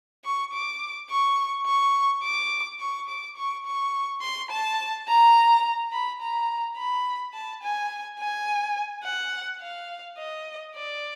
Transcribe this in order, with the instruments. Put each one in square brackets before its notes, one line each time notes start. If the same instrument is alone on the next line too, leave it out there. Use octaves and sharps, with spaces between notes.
[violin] C#6
D6
C#6
C#6
D6
C#6
D6
C#6
C#6
C6
A5
A#5
B5
A#5
B5
A5
G#5
G#5
F#5
F5
D#5
D5